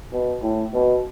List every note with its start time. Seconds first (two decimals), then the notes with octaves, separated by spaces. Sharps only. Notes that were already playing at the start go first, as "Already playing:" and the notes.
0.12 B2
0.43 A2
0.74 B2